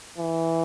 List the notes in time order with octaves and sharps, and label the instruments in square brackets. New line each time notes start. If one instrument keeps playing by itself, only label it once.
[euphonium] E3